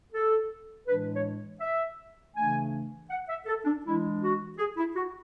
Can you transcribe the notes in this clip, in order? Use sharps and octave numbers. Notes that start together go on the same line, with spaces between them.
A4
A2 E3 G#3 D4 B4
C#5
E5
C#3 E3 A3 D4 G#5
F#5
E5
A4
D4
E3 G#3 D4 E4
F#4
G#4
E4
F#4